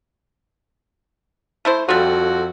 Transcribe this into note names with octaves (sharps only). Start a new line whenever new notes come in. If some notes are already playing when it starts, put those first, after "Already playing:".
A3 E4 C5
F2 G3 F4 F#4 A4